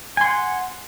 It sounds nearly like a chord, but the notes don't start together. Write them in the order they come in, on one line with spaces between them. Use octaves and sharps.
G#5 C6 F#5